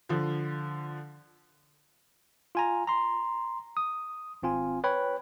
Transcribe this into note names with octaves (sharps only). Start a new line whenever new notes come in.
D3 F3
F4 G#5 A#5
A#5 C6
D#6
G#1 C4 F4 G#5
B4 C#5 G5 B5